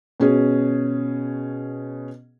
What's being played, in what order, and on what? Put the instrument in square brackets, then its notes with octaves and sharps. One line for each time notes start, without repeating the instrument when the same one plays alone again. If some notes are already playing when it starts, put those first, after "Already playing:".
[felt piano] B2 C#4 G#4